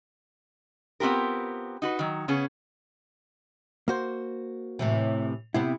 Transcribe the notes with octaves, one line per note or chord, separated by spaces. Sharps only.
B3 C4 F4 G4 A#4
D#4 F#4 B4
D#3 F#3
C#3 B3 C#4 G#4
A#3 F#4 C5
A2 C3 E3
C3 B3 C4 E4